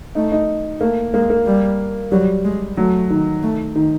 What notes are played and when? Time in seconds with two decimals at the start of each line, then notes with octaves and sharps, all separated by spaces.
0.15 A3 D#4
0.32 D#4
0.81 A3 A#3
1.14 G#3 A#3
1.30 A#3
1.46 G3
2.12 F#3 G3
2.44 G#3
2.77 F#3 A3
3.10 D#3
3.43 A3
3.75 D#3